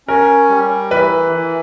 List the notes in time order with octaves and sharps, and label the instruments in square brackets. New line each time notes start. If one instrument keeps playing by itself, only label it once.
[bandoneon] C#4 [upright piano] A#4
[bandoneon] G3
[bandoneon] E3 [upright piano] B4
[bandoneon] E3